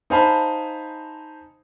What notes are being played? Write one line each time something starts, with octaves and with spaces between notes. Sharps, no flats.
D#4 C5 F5 G#5 A5 B5